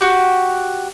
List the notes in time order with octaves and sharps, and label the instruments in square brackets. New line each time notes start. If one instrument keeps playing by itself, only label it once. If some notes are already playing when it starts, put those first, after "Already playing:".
[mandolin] F#4 G4